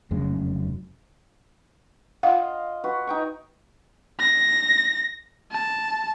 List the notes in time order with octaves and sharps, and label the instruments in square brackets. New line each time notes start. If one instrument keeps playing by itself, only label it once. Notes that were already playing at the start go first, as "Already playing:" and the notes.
[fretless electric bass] F1 F#2 C#3 G#3
[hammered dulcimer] F4 D#5 [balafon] F5 F#5
[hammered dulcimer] F#4 B4
D#4 G5 C#6
[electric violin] A#6
A5